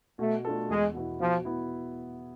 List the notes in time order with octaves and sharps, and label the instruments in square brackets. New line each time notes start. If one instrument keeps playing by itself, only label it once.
[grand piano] B2 [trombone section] A3
[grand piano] A3 D4 F4 A4
[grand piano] E2 [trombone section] G#3
[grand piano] B2 B3 E4
[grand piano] B2 [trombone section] F3
[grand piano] B3 E4